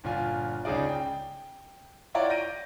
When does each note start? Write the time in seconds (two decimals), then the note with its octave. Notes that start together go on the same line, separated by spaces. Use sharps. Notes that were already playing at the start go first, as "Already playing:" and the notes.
0.04 G1 A#2 F4 G#5
0.65 C#2 C#3 C#4 D#4 G#4 D5
0.89 G5
2.14 E4 F4 C#5 D5 F#5 A#5
2.30 G6 A#6 D7 D#7